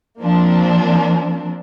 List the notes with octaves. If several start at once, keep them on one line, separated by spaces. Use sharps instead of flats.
F3 A#3 C4 D4